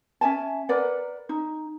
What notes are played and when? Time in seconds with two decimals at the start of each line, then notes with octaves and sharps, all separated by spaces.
0.21 C#4 E5 G#5 A5
0.69 A#4 B4 D5 F#5
1.29 D#4